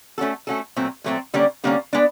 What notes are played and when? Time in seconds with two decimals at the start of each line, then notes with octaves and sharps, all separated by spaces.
0.18 A3 C#4 F#4 A4
0.47 A3 C#4 F#4 A4
0.76 A#2 F#3 A3 C4
1.04 A#2 F#3 A3 C4
1.34 D3 G3 A#3 C#4
1.64 D3 G3 A#3 C#4
1.93 G#3 B3 D4